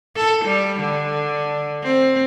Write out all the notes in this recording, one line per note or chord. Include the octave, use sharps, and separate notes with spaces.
A4
G3
D3
C4